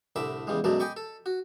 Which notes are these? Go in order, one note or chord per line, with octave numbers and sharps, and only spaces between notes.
C2 A2 D3 E5 B5 D6
E2 C#3 G3 G#3
F#2 B2 F#3 G#3 A3 D5
D#5 G5 G#5 B5 C#6 D6
A4
F#4